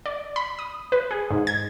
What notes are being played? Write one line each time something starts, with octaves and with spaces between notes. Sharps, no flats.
D5
B5
D#6
B4
G#4
G#2
G#6